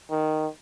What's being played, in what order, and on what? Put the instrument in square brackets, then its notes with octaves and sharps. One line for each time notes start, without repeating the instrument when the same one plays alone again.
[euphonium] D#3